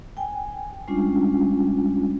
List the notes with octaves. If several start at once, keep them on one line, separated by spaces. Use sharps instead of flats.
G5 G#5
G3 G#3 C#4 D4 F4